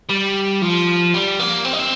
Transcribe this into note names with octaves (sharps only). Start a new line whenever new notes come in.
G3
F3
G3
A#3
C4
D#4
C4